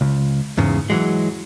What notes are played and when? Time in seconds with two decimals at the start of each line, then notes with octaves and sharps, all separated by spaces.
0.01 C#2
0.58 E2 G#2 C#3
0.90 E3 F#3 G#3